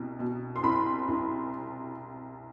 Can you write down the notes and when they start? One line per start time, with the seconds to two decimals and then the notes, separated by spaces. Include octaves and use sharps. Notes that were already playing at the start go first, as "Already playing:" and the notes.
Already playing: C2 B2
0.19 B2
0.56 C6
0.63 C2 B5
1.08 C2